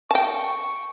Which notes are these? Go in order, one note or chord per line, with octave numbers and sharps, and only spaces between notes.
G5 A5 C#6